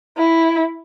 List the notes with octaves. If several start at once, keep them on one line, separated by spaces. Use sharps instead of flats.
E4